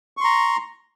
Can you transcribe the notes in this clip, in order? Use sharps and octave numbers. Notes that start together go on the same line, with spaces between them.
A#5 C6 C#6